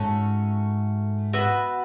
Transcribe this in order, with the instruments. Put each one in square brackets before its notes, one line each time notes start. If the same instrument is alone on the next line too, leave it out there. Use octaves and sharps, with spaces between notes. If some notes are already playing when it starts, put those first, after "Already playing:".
Already playing: [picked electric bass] G#2 [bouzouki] A3 C#4 F#4 A4
[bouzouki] B3 F#4 B4 E5